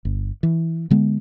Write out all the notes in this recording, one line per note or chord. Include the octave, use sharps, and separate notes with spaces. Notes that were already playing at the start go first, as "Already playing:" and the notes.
G1
E3
D3 G#3 B3